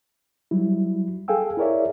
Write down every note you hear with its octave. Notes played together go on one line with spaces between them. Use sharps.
F#3 G3 E4
G#4 A4 F5 G5 G#5 E6
E4 G#4 A#4 C#5 D5 E5